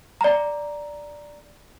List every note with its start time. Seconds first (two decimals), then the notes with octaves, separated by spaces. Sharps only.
0.21 D5 A#5